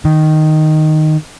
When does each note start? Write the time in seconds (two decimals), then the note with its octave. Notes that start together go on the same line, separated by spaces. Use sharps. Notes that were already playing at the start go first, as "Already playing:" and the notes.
0.05 D#3